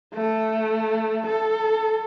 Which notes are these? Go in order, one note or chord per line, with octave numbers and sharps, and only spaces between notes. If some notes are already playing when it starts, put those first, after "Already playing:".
A3
A4